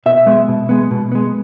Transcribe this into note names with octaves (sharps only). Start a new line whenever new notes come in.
B2 E5
G#3 B3
B2
G#3 B3
B2
G#3 B3